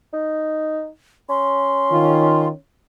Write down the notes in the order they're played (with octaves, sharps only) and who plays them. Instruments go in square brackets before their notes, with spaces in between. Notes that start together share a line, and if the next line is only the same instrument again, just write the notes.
[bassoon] D#4
[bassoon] C#4 [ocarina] C6
[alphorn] D#3 [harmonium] F4